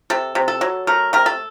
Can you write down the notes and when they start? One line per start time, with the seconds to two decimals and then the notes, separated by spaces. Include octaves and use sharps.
0.10 C3 A4
0.35 C3
0.48 A4
0.61 F#3
0.87 A3 A#4
1.13 C3 A#4
1.26 A4